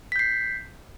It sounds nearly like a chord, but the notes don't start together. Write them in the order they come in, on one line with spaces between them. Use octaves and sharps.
B6 G6 C7